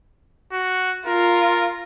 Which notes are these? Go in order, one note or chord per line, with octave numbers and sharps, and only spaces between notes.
F#4
F4 A#4